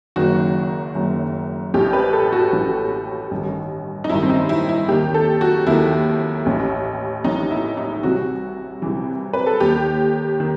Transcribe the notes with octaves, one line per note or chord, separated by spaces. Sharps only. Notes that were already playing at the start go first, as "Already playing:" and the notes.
F#1 F#2 D#3 F#4
F#1 F#2 D#3
A1 A2 E3 G4
B4
A4
F#4
A1 A2 E3
A1 G2 D#3
D#4
A1 G2 D#3 E4
C4
D#4
E4
E4
D#2 D#3 G4
A4
F#4
D#2 D#3 E4
A1 A2 E3
A1 A2 E3 D#4
E4
D#4
C2 C3 E3 F#4
C2 C3 E3
B4
A4
D#2 D#3 G4
D#3